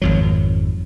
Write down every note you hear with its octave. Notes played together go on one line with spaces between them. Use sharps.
G#1 F2 F#3